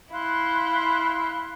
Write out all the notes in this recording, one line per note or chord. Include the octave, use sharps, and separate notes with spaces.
E4 F5 C6 F#6